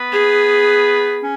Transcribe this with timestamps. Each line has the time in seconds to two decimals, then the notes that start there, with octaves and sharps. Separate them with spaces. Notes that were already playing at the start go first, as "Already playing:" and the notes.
Already playing: B3 B4
0.12 G#4
1.21 C#4